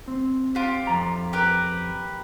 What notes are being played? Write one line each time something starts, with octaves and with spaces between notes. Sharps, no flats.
C4
F4 G4
F2 A#5
G4 A#4 B4